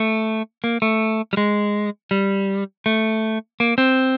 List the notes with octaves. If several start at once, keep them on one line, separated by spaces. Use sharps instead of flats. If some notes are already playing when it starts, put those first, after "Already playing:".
Already playing: A3
A#3
A3
G3
G#3
G3
A3
A#3
C4